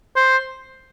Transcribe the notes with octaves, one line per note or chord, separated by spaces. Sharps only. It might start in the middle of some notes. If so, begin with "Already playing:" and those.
C5